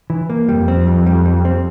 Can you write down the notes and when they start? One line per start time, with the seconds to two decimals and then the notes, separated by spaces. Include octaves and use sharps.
0.10 E3
0.30 A#3
0.48 F2 G3
0.68 C4
0.87 G3
1.06 G3
1.25 G3
1.45 C4